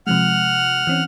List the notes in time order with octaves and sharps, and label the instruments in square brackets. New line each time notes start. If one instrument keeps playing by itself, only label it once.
[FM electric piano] C3 F3 G#3 [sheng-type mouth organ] F#5 F6
[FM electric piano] E3 C4 C#4